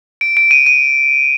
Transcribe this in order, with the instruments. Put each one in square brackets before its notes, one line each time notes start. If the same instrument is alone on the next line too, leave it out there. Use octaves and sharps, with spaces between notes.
[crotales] D7
D7
D#7
D#7